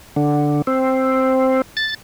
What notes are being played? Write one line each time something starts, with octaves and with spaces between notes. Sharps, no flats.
D3
C4
A6